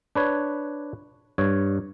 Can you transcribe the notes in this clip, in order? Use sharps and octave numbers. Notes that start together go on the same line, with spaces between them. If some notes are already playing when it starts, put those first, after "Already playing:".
D4 B4 C#5
G2 C#5